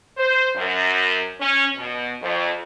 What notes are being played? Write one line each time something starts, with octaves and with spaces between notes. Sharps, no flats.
C5
F#2
C#4
B2
F2